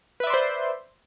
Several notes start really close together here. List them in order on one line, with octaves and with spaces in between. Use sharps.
B4 E5 D5 C6 C5